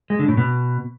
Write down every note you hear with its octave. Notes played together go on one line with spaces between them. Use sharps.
G#3
D3
A2
B2